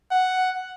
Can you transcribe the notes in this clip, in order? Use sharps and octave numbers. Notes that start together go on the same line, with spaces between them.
F#5